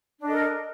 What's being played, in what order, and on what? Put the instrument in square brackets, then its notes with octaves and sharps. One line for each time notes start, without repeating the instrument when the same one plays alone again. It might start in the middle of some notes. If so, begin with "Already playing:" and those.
[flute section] D4
D#5
A4
A#4